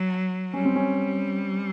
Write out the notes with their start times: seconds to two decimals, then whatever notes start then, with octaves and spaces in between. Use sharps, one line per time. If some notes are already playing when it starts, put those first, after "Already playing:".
Already playing: F#3
0.54 G3 C#4
0.65 C4
0.76 C#4